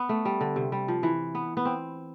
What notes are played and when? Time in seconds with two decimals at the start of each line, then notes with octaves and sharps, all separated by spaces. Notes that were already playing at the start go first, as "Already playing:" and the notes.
Already playing: B3
0.09 A3
0.25 G3
0.41 D3
0.56 C3
0.72 G3
0.88 F3
1.03 E3
1.35 B3
1.57 B3
1.65 C4